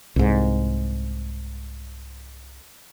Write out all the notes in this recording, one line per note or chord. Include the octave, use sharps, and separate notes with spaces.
C2 G#2